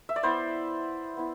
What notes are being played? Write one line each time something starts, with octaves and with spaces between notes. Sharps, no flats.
E5
D5
B3 E4 C5
B3 E4